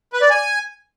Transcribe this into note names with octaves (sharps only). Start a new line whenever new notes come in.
B4
D5
G#5